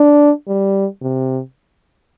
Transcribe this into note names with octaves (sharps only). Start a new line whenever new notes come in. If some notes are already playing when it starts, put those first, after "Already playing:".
Already playing: D4
G3
C3